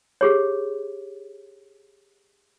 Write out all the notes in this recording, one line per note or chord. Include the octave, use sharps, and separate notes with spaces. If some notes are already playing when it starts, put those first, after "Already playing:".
G4 G#4 C#5